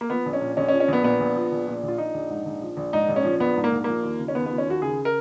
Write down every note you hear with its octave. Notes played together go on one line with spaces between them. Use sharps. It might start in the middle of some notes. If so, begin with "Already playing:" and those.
A#3
F3 B3
A#1
C#4
A#2
A#1 C#4
C#4
F3
C#4
A#1 B3
A#2 B3
A#1
F3
A#1
A#2
A#1
F4
F3 D#4
A#1
G#2
A#1
F3
A#1
G#2 D#4
A#1
C#4
F3
A#1 B3
G#2
A#3
A#1
F3 A#3
D#2
C#3
C#4
D#2 B3
B3
F3
C#4
D#2 F#4
C#3 G#4
A#4